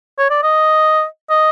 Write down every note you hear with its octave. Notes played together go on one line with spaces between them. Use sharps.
C#5
D5
D#5
D#5